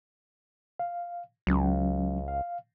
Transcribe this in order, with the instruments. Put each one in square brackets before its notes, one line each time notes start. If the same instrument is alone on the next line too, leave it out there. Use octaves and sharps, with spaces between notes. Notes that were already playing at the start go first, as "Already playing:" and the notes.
[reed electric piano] F5
[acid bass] C#2 [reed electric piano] F#3 C#4
[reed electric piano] F5